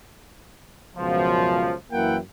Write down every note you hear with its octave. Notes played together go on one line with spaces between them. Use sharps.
C#2 F#2 B2 F3
F#2 E3 A#3 E4 F#5 G5